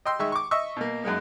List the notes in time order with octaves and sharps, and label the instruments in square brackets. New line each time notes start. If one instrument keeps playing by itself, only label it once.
[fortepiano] D#5 G5 C6 E6
D#3 G#3 E5 C#6
C#6 D6
D#5 E5 C#6 E6
B2 A#3
F#2 G#3 A#3 D#4